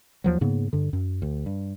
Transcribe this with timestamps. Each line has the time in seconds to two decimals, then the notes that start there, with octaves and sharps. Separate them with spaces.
0.24 D#2 F3 F#3
0.41 G#2 C#3 A#3 B3
0.73 G2 D3
0.93 F#2
1.22 D2
1.46 G2